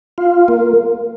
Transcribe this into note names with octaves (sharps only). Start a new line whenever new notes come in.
F4
A#3